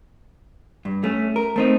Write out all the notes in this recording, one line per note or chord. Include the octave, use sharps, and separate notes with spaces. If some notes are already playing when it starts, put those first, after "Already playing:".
G2
A3 C#4
A#4
A3 C4 D#4